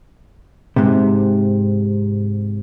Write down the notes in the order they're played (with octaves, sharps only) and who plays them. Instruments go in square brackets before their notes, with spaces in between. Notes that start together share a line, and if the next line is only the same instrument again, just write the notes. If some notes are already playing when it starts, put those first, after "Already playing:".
[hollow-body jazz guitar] G#2 C3